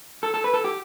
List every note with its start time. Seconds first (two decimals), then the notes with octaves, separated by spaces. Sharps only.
0.23 A4
0.34 A4
0.44 B4
0.54 A4
0.64 G4